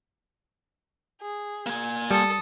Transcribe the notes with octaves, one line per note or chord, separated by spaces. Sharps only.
G#4
A#3 G#5
G3 A4 D#6